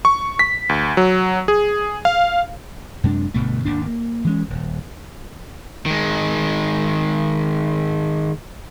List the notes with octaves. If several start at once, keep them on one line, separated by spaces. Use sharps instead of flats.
C#6
B6
D2
F#3
G#4
F5
F#2 C3 G#3 D4
G1 D2 B2 A3
G#1 D#2 D4
A#3
E3 G#3 C#4
D#1
D#3 G#3